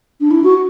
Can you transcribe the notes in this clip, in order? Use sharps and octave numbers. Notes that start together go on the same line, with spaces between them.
D4
E4
F#4